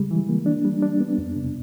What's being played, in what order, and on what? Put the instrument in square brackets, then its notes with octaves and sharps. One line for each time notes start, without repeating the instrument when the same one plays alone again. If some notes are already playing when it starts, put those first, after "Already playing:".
Already playing: [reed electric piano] C#3 G3 G#3
E3
A#3
D4
G3
D4
B3
F2
C3